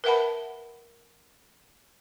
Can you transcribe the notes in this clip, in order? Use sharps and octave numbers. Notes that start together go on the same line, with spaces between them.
A#4 B4 E5 F#5 A5 B5